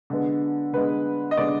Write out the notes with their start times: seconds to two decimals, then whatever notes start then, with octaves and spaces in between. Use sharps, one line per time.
0.10 D3 G#3 B3
0.73 D3 G#3 B3 B4
1.31 D#5
1.37 D3 G#3 B3 D5